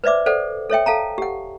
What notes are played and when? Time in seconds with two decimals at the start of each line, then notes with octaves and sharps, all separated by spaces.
0.04 B4 C5 D5 E5 D6
0.26 A4 C5 D5 F#5
0.70 A4 C#5 E5 G5
0.86 A4 F5 A5 A#5
1.18 G4 F#5